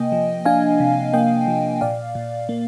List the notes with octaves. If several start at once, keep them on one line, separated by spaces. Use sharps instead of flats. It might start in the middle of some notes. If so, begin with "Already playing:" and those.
Already playing: C3 A#3 D#5 G5 G#5
F3
D4 F5 G#5
C3
A#3 D#5 G5
F3
A#2 D5 F5
A#2
A#3